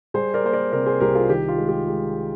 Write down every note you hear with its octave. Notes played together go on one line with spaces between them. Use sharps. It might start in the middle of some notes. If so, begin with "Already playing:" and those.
G3 G#4 C5
A#4 D5
A#3 C5
A#4 D5
C3 A#4 D5
G#4 C5
C2 G4 A#4
F4 G#4
D#3 G4
F4
G#3
G4
G#3